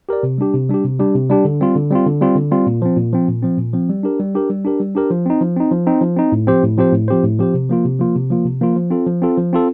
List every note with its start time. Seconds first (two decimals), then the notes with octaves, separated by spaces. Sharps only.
0.09 G4 A#4 D5
0.23 C3
0.38 G3 D4 G4
0.54 C3
0.69 G3 D4 G4
0.84 C3
1.00 G3 D4 G4
1.15 C3
1.29 G3 D4 G4
1.45 D3
1.61 G3 C4 F4
1.76 D3
1.91 G3 C4 F4
2.06 D3
2.21 G3 C4 F4
2.36 D3
2.51 G3 C4 F4
2.67 A#2
2.82 F3 C4
2.97 A#2
3.13 F3 C4
3.28 A#2
3.42 F3 C4
3.58 A#2
3.73 F3 C4
3.89 G3
4.03 D4 G4 A#4
4.20 G3
4.35 D4 G4 A#4
4.50 G3
4.65 D4 G4 A#4
4.80 G3
4.95 D4 G4 A#4
5.11 F3
5.26 C4 D#4
5.41 F3
5.56 C4 D#4
5.72 F3
5.87 C4 D#4
6.01 F3
6.17 C4 D#4
6.32 A2
6.47 F3 C4 G4 C5
6.63 A2
6.77 F3 C4 G4 C5
6.93 A2
7.08 F3 C4 G4 C5
7.23 A2
7.39 F3 C4 G4 C5
7.54 C3
7.69 F3 A#3 F4
7.85 C3
7.99 F3 A#3 F4
8.15 C3
8.30 F3 A#3 F4
8.45 C3
8.61 F3 A#3 F4
8.76 F3
8.91 C4 F4 A4
9.07 F3
9.22 C4 F4 A4
9.38 F3
9.53 C4 F4 A4